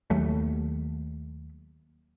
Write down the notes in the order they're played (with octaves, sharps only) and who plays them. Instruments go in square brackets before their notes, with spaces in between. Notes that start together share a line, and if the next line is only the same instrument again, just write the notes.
[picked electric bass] D#2 F#3 A3